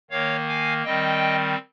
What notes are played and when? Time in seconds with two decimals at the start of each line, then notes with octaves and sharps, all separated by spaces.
0.10 D#3 A#3 C#5 F5
0.48 F5 G#5
0.85 D#3 G3 C4 D#5 G5